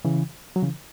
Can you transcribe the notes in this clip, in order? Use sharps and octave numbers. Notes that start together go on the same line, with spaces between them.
C#3 E3
F#3
C#3 E3